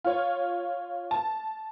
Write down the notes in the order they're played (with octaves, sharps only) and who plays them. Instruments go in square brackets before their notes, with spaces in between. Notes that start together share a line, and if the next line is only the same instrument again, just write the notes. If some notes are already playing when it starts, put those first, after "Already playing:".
[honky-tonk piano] F4 C#5
A5